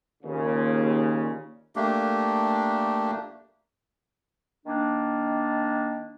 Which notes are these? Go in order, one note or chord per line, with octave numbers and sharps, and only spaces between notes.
D#2 A#2 C#3
A3 A#3 D4 G4
D#3 A#3 D4